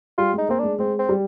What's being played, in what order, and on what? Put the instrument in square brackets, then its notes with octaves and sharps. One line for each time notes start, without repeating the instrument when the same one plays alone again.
[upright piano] G3 [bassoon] F4
[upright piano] G#3
[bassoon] D#4
[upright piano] A#3 [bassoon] C4
[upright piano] G#3 [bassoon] D4
[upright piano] G#3 [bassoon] C4
[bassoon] C4
[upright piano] G3